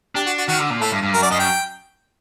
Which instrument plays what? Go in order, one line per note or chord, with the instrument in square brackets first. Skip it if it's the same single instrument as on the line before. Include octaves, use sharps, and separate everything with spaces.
[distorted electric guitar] D4 [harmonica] G4
[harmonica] F#4
F#4
[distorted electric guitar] D#3 [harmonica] F#4
[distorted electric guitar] D3
A#2
[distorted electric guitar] A2 [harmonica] A4
[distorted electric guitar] G2
G2
[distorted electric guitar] F#2 [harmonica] A#4
[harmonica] D5
[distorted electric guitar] F#2 [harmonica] D#5
[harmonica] G5